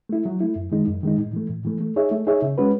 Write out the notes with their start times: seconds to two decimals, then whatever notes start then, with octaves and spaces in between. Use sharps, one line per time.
0.09 A3 E4
0.26 F#3
0.41 A3 E4
0.56 F#2
0.72 D#3 G#3 D#4
0.87 F#2
1.03 D#3 G#3 D#4
1.18 A2
1.33 E3 A3
1.50 A2
1.65 E3 A3
1.81 A3
1.96 D#4 G#4 C#5 E5
2.11 A3
2.27 D#4 G#4 C#5 E5
2.42 C#3
2.58 G#3 C#4 F#4 B4